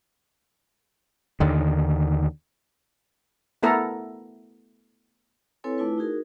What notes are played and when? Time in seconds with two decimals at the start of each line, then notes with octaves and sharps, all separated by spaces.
1.40 D#2 D3 D#3
3.63 A3 B3 E4 A4 A#4 A#5
5.64 C4 E4 A4 B4 C#5 G#5
5.78 A3 D4 E4 F4 B4
5.98 D#4 F#4 G#4 A#4